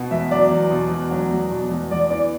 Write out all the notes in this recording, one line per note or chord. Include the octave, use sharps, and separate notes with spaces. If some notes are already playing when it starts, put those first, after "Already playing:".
Already playing: B2
E2 E5
F#3 D5
E2
B2
E2
F#3
E2
B2
E2
E2 D5
E3 D5